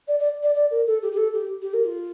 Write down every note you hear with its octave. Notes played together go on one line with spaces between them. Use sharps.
D5
D5
D5
D5
A#4
A4
G4
G4
A4
G4
G4
A#4
F4